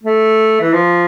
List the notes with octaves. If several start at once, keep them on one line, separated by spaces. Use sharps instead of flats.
A3
E3
F3